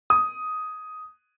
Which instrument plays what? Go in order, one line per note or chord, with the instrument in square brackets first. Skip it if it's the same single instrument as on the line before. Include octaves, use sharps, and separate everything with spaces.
[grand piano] D#6